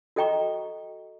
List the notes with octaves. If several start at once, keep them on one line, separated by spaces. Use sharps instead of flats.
F#4 A4 D#5 G5 A#5 C#6